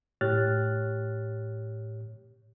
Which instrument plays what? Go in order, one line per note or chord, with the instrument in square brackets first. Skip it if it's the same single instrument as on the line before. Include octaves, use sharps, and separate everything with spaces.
[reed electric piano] A2 G4 C#5 F6 F#6 A6